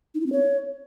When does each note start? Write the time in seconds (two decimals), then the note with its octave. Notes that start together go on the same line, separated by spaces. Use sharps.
0.15 D#4
0.21 E4
0.26 C4
0.32 C#5